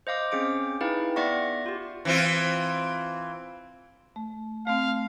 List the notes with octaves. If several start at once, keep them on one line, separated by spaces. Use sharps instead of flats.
C5 D#5 F5 D6
C4 C#4 G#4 D6 D7
D#4 E4 G#4 B4 F5 G5
B3 D5 E5 F#5 C#6 A#6
F4 G4
E3 C4 F4
A3
A3 C4 F5